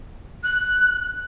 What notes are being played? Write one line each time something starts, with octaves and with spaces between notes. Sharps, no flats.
F#6